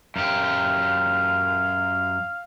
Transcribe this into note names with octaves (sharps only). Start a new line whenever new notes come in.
F#2 G4 F5